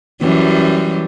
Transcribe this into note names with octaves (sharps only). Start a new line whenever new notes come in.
F#2 E3 G3